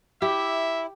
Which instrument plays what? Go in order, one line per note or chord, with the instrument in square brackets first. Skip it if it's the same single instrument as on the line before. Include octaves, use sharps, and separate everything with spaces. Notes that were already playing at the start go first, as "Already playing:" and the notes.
[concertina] E4 [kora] G4 [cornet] E5